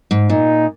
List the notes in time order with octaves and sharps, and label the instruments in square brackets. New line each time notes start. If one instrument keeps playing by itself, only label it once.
[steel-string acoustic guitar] G#2
[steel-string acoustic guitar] A#2 [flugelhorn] D#4